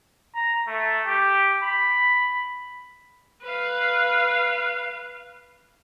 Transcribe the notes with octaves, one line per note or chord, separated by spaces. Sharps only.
A#5
A3
G4
B5
B4 F5